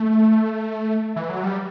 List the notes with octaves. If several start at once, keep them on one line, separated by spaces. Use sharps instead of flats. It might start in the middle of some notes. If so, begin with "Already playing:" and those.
Already playing: A3
E3
F#3
G3